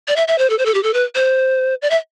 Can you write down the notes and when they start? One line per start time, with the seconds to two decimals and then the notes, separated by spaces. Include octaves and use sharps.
0.08 D5
0.16 E5
0.28 E5
0.38 C5
0.50 A4
0.59 C5
0.66 A4
0.74 G4
0.83 A4
0.94 B4
1.15 C5
1.82 D5
1.91 E5